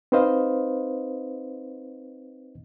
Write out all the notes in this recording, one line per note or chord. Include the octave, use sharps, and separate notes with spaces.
C4 D#4 B4 C5 D#5 F5